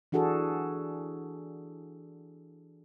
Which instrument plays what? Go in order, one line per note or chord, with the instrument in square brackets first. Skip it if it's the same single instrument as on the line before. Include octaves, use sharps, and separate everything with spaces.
[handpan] E3 D4 F#4 G#4 A4